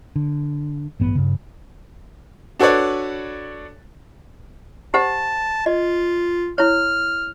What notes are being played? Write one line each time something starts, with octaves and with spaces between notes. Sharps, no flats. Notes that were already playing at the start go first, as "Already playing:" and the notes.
D3
A1 G2 B3
G2 C#3
D4 F#4 A4 B4 C#5 D5
G4 C5 F#5 A5
F4 D#5
E4 C#5 F6